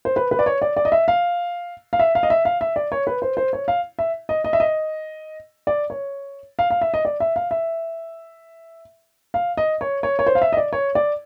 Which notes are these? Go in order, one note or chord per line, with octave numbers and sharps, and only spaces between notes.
C5
B4
B4
D5
C#5
D5
D5
D#5
E5
F5
F5
E5
F5
D#5
E5
F5
E5
D5
C#5
B4
C5
C5
C#5
F5
E5
D#5
D#5
E5
D#5
D5
C#5
F5
F5
E5
D#5
D5
E5
F5
E5
F5
D#5
C#5
C#5
C#5
C5
F5
E5
D#5
D5
C#5
D5